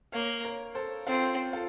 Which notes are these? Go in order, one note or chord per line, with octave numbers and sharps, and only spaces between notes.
A#3 C#5 F5
A#4 C#5
A4 C5
C4 F4 A4
F4 A4